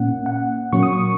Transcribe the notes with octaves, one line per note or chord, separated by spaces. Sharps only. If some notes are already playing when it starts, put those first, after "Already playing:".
Already playing: A#2 A#3 C#4 F#5
F#5
A#2 F#3 A#3 C#4 C#6
D#6
C#6